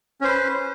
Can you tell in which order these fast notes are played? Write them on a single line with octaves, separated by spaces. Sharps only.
C#4 C5 B4